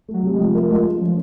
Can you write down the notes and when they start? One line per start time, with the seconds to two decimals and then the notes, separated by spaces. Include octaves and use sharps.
0.09 F#3 A3
0.23 C3
0.34 G#3
0.39 F3
0.54 A3 A#4
0.70 G#3 F4
0.85 A3
1.00 F3 C#4